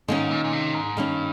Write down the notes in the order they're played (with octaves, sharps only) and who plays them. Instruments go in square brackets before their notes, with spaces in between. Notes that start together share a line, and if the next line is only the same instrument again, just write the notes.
[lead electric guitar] G#2 [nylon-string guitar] D#3 A#3 C#4
[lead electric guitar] A#2
A#2
C3
G#2
[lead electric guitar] G2 [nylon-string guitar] D#3 A#3 C#4